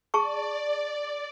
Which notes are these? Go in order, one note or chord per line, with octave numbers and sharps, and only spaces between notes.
G#4 D5 A5 C#6